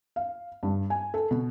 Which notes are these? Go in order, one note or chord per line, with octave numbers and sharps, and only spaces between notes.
F5
G2
G#5
A4
B2